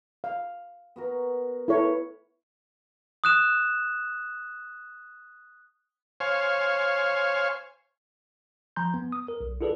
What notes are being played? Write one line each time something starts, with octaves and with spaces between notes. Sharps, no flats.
F5
B3 F#4 A#4
E4 A4 B4 C#5
D#6 F#6 E7
C5 C#5 F5 G#5
F3 G#5 A#5 C6 G6
B3
D#6
A#4
B1
E4 F4 G#4 A4 B4 D5